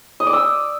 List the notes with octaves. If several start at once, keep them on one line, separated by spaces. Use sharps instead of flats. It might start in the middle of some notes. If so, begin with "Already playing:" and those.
D#5
D5
E6